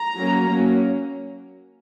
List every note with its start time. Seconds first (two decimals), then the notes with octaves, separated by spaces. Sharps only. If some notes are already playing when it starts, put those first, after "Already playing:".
Already playing: A#5
0.16 F#3 A#3 C#4
0.47 F#3 A#3 C#4